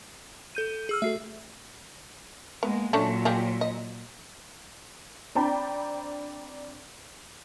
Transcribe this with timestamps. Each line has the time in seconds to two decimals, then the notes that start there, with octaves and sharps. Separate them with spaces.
0.55 A4 G6 D#7
0.89 G#4 E6 F6
1.02 A3 F#4 A4 E5 C7
2.63 G#3 A#3 B3
2.93 A#2 F#3 A3 C#4 D4
3.25 F4 G4 G#4
3.61 D#5
5.35 C4 D4 D5 G5 A#5 B5